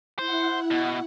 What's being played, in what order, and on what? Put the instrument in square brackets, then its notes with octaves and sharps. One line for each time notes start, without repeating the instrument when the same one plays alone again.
[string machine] E4 F#5 [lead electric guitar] C5
[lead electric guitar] B2